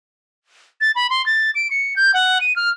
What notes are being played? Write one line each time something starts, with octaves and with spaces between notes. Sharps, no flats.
A6
B5
C6
A6
D7
C#7
G6
F#5
D#7
F6